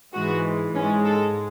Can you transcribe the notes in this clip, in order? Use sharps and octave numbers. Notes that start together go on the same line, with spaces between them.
G#2 E3 G#3 F#4
G#2 G#3 C#4
A4